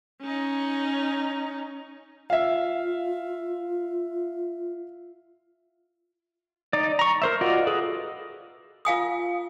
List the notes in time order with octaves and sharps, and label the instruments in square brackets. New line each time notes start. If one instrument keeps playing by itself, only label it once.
[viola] C#4 D#4
[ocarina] F4 [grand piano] E5 F5
[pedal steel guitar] D#4 D5
A#5 C#6
A#4 C5 E5
F4 F#4 D5 D#5
G#4 A4 B4
[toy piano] F4 F5 G#5 D#6